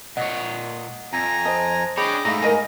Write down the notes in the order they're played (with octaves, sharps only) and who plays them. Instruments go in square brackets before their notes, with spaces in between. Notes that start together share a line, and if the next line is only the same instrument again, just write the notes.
[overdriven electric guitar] A#2 C#5 [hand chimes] D#5 F#5
[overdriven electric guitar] F2 [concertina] G#5 A#5
[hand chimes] C5 A5 [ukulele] D#5
[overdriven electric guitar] D4 C#5 [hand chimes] G#4 [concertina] D#5 G5 D6 [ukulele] B5
[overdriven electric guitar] G#2 A3 [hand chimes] F5 A#6 [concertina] A#5
[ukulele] A#4 D#5 G#5